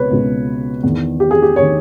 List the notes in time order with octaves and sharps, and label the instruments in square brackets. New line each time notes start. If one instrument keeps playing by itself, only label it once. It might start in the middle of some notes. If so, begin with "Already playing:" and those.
Already playing: [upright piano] C#2 B2 B4 C#5
C#2 B2
E2 D#3
G4
G#4
G4
D#3 C#5